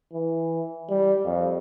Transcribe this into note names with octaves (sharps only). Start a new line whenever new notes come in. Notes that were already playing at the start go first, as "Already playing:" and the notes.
E3
G3
F2